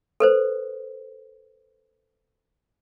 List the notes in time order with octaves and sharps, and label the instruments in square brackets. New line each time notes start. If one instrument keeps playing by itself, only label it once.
[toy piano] A4 B4 C5